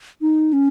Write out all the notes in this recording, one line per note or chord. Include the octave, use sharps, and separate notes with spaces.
D#4
C#4